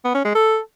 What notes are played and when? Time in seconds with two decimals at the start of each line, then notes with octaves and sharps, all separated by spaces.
0.04 B3
0.15 C#4
0.25 G#3
0.35 A4